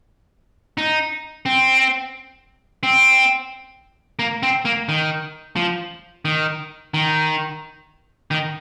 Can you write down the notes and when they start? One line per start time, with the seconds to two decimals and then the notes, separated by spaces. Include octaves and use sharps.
0.78 D#4
1.46 C4
2.83 C4
4.19 A#3
4.43 C4
4.65 A#3
4.89 D#3
5.56 F3
6.25 D#3
6.94 D#3
8.31 D#3